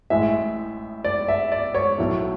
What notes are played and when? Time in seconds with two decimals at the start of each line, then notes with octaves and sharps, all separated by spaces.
0.10 A1 A2 G#3 E5
1.04 D5
1.28 E5
1.52 D5
1.74 C#5
1.98 B1 A2 F#3 A3